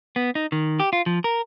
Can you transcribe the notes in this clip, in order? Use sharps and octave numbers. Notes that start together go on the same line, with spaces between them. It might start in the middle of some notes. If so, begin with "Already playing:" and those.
B3
D#4
D#3
G4
F4
F3
A#4